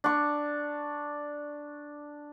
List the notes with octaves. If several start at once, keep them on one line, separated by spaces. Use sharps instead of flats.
D4 C#6